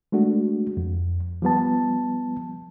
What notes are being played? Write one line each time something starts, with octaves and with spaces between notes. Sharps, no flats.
G#3 A3 D4 F#4
F2
F3 G3 B3 A5